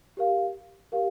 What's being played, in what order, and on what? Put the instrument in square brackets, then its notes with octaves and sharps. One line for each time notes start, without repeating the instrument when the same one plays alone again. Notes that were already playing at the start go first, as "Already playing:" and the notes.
[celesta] G4 A#4 F5
G4 A#4 F5